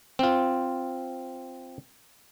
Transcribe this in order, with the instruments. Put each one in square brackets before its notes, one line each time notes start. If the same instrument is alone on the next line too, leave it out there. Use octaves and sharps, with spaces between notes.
[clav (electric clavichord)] C4 F4